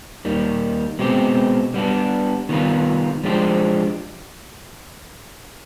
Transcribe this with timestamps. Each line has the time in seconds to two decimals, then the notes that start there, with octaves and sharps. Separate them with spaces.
0.25 D#2 D#3 G3
0.99 B2 G#3 C4 G4
1.74 G3 B3 D4
2.49 D#3 G3 B3 F4 B4
3.24 F3 G#3 D4 G4 C5